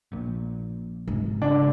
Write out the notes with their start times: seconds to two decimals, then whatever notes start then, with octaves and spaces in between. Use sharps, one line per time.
0.12 A#1 A#2
1.08 G#1
1.42 C#3 D4